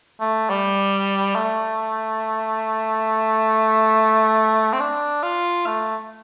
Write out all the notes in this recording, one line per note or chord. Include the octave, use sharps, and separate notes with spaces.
A3
G3
A3
C4
D4
F4
A3